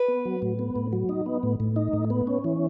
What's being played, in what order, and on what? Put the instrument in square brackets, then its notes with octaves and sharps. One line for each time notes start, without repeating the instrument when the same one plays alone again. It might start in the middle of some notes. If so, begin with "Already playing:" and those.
Already playing: [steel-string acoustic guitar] B4
[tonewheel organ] B3
F#3
A2
B3
A2
F#3
D#4
B3
A2
A2
D#4
A2
B3
C#4
E3